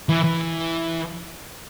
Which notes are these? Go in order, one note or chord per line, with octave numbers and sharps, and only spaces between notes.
E3
E3